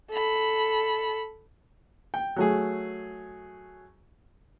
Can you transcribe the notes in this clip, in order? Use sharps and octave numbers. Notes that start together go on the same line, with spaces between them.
A4 B5
G5
F#3 A3 G#4